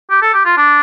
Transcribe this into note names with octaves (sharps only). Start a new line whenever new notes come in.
G4
A4
G4
F4
D4